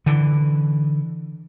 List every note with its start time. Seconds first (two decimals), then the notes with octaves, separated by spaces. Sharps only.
0.06 D3 E3